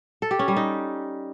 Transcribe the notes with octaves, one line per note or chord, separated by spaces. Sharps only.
A4
G4
C#4
G3
D#4